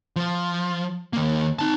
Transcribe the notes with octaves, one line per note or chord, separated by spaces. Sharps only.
F3
D#3 A#3
D#4 A5